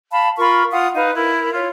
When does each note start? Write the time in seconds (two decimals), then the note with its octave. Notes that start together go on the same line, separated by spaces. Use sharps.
0.11 F5 A5 B5
0.38 F4 A#4 B5 C#6
0.72 F4 F5 F#5 D#6
0.94 D#4 B4 F5
1.14 E4 A#4
1.54 F4 C#5